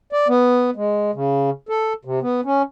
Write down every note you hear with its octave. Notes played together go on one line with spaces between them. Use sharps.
D5
B3
G#3
C#3
A4
C3
B3
C#4